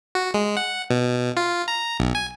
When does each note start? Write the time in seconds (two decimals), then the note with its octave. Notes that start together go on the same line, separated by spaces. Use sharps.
0.15 F#4
0.34 G#3
0.57 F#5
0.90 B2
1.37 F4
1.68 A#5
2.00 B1
2.15 G#5